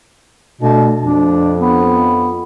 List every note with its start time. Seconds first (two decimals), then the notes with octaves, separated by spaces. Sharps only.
0.61 B2 A3 D4
1.04 F2 D4
1.62 B3